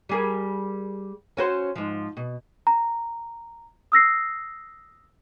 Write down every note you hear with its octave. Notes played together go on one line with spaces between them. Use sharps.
G3 G#4 A#4
C#4 F#4 C5
G#2 F3
B2
A#5
D#6 E6 A#6 C7